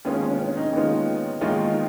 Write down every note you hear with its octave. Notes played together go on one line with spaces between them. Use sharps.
D#2 D#3 G#3 B3 C#4 F4
C#4
C#4
D#4
D#2 D#3 G#3 B3 F4
D#2 D#3 G#3 B3 D#4 F4